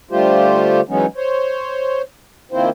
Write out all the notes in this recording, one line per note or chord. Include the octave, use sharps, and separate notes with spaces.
D3 G3 A3 F4 G4 C5
E3 F#3 G#3 B3 C#4 D#4
C5 C#5
D#3 F3 A#3 C4 E4 C5